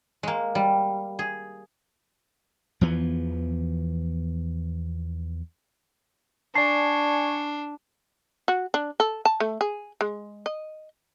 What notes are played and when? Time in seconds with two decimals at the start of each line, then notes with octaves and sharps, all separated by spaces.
0.23 G#3 A#3
0.55 G3
1.19 G#4
2.81 E2 E3 F3 B3
6.55 D4 D5 G#5 A5 C#6 C7
8.48 F#4
8.74 D4
9.00 A4
9.25 A5
9.40 A3
9.61 G#4
10.01 G#3
10.46 D#5